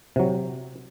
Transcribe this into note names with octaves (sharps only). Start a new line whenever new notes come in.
C3 F#3